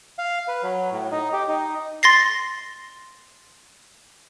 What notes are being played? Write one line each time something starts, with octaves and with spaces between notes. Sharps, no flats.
F5
B4
F#3
A2
D#4
G4
D#4
C6 A6 A#6 C7